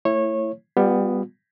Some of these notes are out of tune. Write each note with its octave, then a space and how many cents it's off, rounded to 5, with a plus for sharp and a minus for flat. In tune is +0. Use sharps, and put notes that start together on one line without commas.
A3 +20 E4 +10 C#5 -20
G3 +20 B3 +5 F4 +40